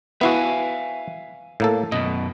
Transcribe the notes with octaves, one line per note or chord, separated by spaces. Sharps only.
B3 E4 F#4 E5 F5 G#5
A2 A#3 A4
F#2 B2 D#5